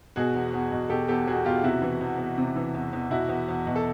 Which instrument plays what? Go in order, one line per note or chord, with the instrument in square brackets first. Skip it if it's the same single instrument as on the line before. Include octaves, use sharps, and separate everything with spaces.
[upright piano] B2 F#4 G#4
E2
E2
B2
B2 G4 A4
E2 G4 A4
E2 F#4 G#4
B2 F4 G4
C3 E4 F#4
E3
E2
E2
C3
E3
E2
E2
B2 E4 F#4
E2
E2
B2
A4